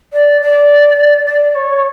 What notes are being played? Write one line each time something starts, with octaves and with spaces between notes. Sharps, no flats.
D5
D5
D5
C#5